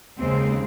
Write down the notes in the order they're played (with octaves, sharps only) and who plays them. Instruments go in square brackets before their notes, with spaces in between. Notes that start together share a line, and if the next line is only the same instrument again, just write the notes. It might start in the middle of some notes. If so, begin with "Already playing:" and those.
[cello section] D#2 C#3 G#3 C4